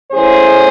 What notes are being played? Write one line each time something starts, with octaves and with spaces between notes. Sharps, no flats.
A2 E3 G#3 C#4 G#4 C5